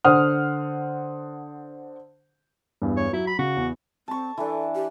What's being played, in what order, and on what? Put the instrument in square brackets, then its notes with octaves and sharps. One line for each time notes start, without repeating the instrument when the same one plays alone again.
[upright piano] D3 C5 F#5 D#6 F6
E2 G2
[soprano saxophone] C#5
[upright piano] F#3 [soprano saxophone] E4
[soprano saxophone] B5
[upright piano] C#3 [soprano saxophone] F#4
[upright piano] E2
[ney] C4 [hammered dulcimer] A5 C#6
[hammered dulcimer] E3 D4 [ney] A4
[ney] G4